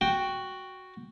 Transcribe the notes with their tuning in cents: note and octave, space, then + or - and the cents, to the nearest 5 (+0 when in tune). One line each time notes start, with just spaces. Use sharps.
F#4 +0 G5 +0